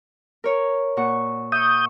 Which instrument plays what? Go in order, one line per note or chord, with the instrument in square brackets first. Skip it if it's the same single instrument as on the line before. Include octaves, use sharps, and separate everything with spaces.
[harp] A#4 C#5
A#2 F#4 C#6
[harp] E5 C#6 [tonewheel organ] D#6 G6